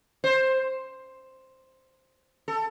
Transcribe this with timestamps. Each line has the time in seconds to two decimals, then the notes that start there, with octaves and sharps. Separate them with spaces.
0.24 C5
2.48 A4